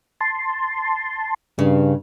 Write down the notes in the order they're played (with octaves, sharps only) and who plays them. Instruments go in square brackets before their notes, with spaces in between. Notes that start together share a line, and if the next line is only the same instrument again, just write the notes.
[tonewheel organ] A5 C6
[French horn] G2 [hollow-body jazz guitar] C#3